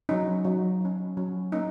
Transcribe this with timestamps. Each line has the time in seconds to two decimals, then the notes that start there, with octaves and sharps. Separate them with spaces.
0.09 F#3 C#4 D#4
0.45 F#3 C#4
0.81 F#3 C#4
1.17 F#3 C#4
1.52 A#3 C#4 D#4